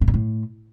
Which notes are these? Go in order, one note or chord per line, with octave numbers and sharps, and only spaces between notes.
A2
A#2
A2